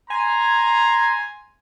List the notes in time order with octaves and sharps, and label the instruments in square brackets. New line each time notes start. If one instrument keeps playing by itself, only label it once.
[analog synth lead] G#5 [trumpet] A#5 [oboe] C6